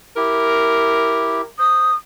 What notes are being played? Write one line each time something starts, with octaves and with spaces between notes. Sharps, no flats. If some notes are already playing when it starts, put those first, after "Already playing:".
E4 G4 A#4
C5 D#6